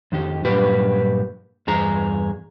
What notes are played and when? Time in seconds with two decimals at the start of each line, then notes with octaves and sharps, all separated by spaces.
0.12 F2 D#3 G4
0.45 G2 A#2 F#3 G4 B4
1.67 E2 G2 G#4 A#5